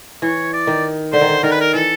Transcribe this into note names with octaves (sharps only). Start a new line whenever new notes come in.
E3 C#5
D5
D#3
D3 C5
D#3
D3
D#3 A#4
B4
A#4
E3 A4